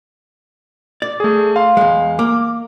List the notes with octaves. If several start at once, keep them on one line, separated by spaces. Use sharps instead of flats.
D5
A3 G#4
F5 C6
E2 G#3
A#3 D6